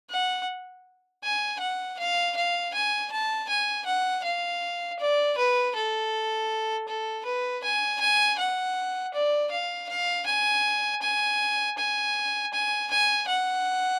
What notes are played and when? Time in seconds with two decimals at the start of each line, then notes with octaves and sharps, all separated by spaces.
0.10 F#5
1.23 G#5
1.60 F#5
1.99 F5
2.36 F5
2.74 G#5
3.12 A5
3.49 G#5
3.86 F#5
4.24 F5
4.99 D5
5.38 B4
5.75 A4
6.88 A4
7.25 B4
7.64 G#5
8.01 G#5
8.39 F#5
9.14 D5
9.52 F5
9.89 F5
10.27 G#5
11.02 G#5
11.78 G#5
12.53 G#5
12.91 G#5
13.28 F#5